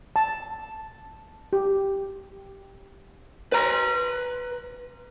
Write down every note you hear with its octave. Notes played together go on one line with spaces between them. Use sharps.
A5
G4
B4 A#5